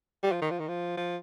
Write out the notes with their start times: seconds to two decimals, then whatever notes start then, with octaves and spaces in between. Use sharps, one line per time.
0.23 G3
0.32 F3
0.42 D#3
0.51 F3
0.59 D#3
0.68 F3
0.97 F3